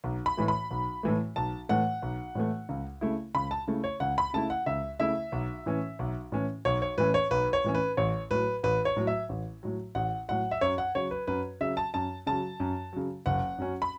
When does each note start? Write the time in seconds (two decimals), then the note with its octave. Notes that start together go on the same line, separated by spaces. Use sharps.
0.04 B1
0.26 B5
0.37 A2 E3 A3
0.48 B5
0.71 B1
1.03 A2 E3 A3
1.36 B1 A5
1.69 A2 E3 A3 F#5
2.02 B1
2.35 A2 E3 A3
2.69 C#2
3.01 C#3 A3 E4
3.35 C#2 B5
3.51 A5
3.68 C#3 A3 E4
3.84 C#5
4.00 C#2 F#5
4.18 B5
4.34 C#3 A3 E4 A5
4.50 F#5
4.66 C#2 E5
5.00 C#3 A3 E4 E5
5.32 B1
5.66 A2 E3 C#4
5.99 B1
6.32 A2 E3 C#4
6.65 B1 C#5
6.82 C#5
6.98 A2 E3 C#4 B4
7.14 C#5
7.31 B1 B4
7.53 C#5
7.64 A2 E3 C#4
7.75 B4
7.97 A1 C#5
8.31 A2 F#3 B4
8.63 A1 B4
8.85 C#5
8.96 A2 F#3
9.07 E5
9.29 A1
9.63 A2 F#3
9.95 A1 F#5
10.28 A2 F#3 F#5
10.51 E5
10.61 F#2 C#5
10.78 F#5
10.95 C#3 F#3 C#5
11.11 B4
11.27 F#2 B4
11.61 C#3 F#3 E5
11.77 A5
11.94 F#2 A5
12.26 C#3 F#3 A5
12.60 F#2
12.93 C#3 F#3
13.26 F#1 F#5
13.58 F#2 F#3 C#4
13.82 B5